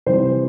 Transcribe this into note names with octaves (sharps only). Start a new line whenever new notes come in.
C3 E3 G3 C5